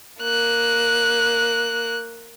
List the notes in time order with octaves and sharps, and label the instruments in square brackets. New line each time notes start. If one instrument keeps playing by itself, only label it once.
[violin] A#3 F#6